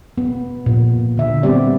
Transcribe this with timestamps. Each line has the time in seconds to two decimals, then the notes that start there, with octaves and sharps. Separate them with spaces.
0.18 B3
0.66 A#2
1.18 D3 E5
1.43 G3 B3 C4 G4 D5